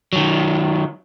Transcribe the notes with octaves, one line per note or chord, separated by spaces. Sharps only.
D#3 F#3